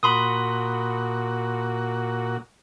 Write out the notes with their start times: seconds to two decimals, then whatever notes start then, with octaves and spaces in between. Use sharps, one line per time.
0.03 A#2 F#4 B5 C6 D#6